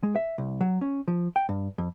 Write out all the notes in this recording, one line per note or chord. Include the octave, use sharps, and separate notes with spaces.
G#3
E5
C2
F#3
C#4
F3
G5
G2
F2